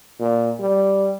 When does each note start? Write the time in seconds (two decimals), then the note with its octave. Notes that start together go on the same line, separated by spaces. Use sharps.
0.20 A#2
0.60 G3